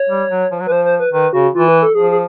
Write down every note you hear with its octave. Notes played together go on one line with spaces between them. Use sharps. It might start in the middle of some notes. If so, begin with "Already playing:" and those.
Already playing: C#5
G3
F#3
F3
F#3
B4
F3 C5
C5
B4
D#3 B4
C#3 F#4
E3 F4
B4
A4
F3 G#4
G#4